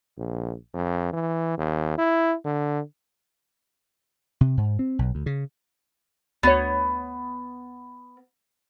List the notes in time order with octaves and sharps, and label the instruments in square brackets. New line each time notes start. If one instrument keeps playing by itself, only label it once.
[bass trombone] A#1
F2
E3
D#2
E4
D3
[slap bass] C3
G#2
C4
B1
D2
C#3
[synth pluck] D2 C#5 [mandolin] B3